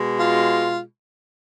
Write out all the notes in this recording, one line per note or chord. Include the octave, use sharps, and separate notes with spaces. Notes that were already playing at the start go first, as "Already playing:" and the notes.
Already playing: B2 G#3
F4